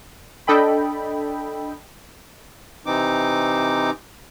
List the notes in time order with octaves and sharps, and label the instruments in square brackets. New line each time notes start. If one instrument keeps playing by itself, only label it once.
[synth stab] D4 A4 D#5 G5 B5
[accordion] C3 E3 C4 D#4 D6